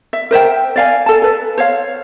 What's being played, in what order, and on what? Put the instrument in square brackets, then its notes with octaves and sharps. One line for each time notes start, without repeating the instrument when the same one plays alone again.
[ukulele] E5
A#4 C5 E5 G5
D5 F5 G#5
A4 A5
A4 B4
C5 C#5 F5